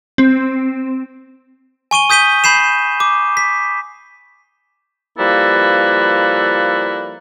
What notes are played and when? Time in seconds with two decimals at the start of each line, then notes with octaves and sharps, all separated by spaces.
0.18 C4
1.91 G#5 C#6 D#7 G7
2.10 D#6 G6 B6 D#7 G7
2.44 B5 G6 C7 E7
3.00 D6
3.37 B6
5.18 F3 G3 A#3 E4 A4 B4